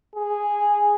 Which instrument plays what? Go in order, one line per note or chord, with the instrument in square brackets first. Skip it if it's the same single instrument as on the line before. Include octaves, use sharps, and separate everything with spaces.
[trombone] G#4